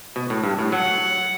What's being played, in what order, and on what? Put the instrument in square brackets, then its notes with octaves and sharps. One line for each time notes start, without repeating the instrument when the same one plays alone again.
[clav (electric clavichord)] B2
A2
G2
A2
[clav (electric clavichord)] F#3 [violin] F#5